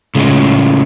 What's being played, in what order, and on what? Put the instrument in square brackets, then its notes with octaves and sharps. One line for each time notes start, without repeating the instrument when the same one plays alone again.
[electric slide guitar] A2 C#3 G#3